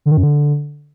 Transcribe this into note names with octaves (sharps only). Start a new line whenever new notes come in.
D3
D#3
F#2
D3